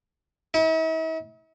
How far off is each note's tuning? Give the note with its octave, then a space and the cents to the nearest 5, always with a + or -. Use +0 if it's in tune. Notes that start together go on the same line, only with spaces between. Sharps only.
E4 -45